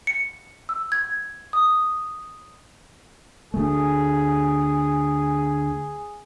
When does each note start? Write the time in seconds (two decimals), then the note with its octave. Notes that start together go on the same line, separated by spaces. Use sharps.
0.07 C#7
0.69 E6
0.92 G#6
1.53 D#6
3.54 D2 A3 G#4